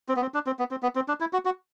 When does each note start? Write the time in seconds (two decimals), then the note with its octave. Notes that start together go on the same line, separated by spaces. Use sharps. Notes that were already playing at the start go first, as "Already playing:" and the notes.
0.08 C4
0.16 B3
0.22 C4
0.34 D4
0.46 C4
0.59 B3
0.71 C4
0.83 B3
0.95 C4
1.08 D4
1.20 E4
1.33 F#4
1.45 F#4